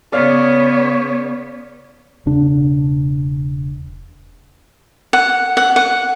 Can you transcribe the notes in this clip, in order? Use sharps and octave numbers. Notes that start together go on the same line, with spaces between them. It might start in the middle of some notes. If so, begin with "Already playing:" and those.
C#3 B3 C#5 D5 F5
E1 C#3 D4
F#5
F#5
F#5